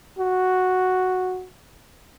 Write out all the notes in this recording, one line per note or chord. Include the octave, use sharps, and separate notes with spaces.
F#4